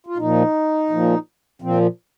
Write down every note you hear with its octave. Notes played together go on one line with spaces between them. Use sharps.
F4
A#2 F3 D#4
A#2 F3
A#2 F3 C4